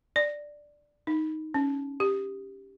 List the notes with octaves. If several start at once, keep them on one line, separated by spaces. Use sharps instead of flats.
D5
D#4
C#4
G4